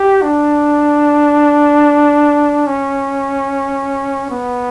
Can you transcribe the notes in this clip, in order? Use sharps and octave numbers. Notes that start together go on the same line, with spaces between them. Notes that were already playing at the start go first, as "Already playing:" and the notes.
Already playing: G4
D4
C#4
B3